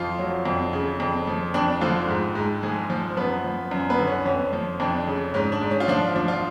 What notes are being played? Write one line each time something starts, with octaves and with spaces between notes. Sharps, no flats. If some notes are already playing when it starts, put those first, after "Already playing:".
Already playing: F2 F3 F4
F#3
F2
C#3
F2
F3
F2 D4
D3 F3 F4
G#2
G#2
F3 G#3 G#4
F3
F#2 B3 B4
F3
F#2
B3 B4
D3
C#4
F2 C#4
F3
F2 D4
C#3
G#2 C#4
D4
G#2
C#4
F4
F3 D4
F3 D4
F4